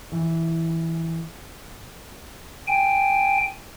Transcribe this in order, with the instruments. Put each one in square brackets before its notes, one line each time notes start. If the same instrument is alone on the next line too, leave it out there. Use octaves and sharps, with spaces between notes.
[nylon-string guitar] E3
[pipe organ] G5 G#5